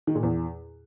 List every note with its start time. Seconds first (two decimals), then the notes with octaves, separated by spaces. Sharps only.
0.07 D#3
0.15 A#2
0.23 E2